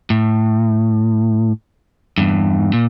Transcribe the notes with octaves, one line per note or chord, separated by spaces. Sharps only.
A2
E2 G2
A#2